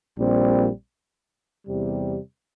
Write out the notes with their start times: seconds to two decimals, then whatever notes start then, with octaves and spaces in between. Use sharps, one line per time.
0.16 A#1 A#2 G3 C4
1.65 E2 C3 G3